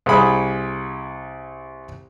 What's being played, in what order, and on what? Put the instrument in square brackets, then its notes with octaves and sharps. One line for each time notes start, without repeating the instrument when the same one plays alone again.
[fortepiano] C2 G#4 B5 D#6